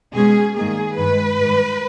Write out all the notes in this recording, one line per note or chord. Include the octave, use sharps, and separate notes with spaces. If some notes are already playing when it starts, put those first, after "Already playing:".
B2 G#3 C#4 G#4
G#2 D#3 G3 A#3 G#4
G2 D#3 G#3 B4
G#2 D#3 G3